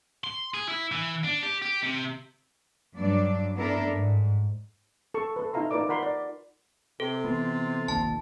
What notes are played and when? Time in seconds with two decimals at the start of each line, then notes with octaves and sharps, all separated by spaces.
0.24 C6
0.54 G#4
0.69 E4
0.92 E3
1.24 D4
1.43 G4
1.62 G4
1.83 C3
2.96 G2 F#3 D4 D5
3.56 B3 D4 E4 A4 A#4
3.91 G#2
5.14 A4 C#6
5.36 A4 B4
5.53 D#4 F4 E5 F5 A#5 C6
5.71 D#4 F4 A#4 B4 D5 D6
5.89 A#4 F#5 B5 C6
6.03 D5
7.00 C3 A4
7.24 E3 B3 F4
7.88 F1 A#1 D#2 A5